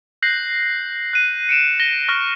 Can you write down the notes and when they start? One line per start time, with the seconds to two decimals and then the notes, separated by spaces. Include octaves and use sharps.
0.22 F#6 G6 A#6 C7 F#7
1.13 F#6 D#7
1.49 C#7 D7 E7
1.80 A#6 G7
2.08 C#6 F6 A#6 G7